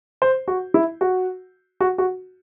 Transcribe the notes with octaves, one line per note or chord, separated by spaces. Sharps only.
C5
F#4
E4
F#4
F#4
F#4